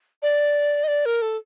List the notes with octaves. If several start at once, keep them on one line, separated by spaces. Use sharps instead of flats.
D5
D#5
D5
A#4
A4